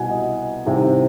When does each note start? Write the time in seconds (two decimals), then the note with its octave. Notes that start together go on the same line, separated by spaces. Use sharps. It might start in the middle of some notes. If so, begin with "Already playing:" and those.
Already playing: C2 B2 F#5 G#5
0.11 D#5
0.65 C2 C3 D#3